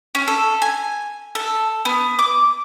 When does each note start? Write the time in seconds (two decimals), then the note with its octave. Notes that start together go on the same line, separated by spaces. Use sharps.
0.15 C#4
0.28 A4
0.62 G#5
1.35 A4
1.85 B3
2.19 D6